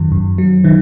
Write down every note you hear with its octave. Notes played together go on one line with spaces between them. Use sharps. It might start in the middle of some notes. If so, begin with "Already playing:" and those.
Already playing: F#2 D#3 F#3
F#2
F#3
D#3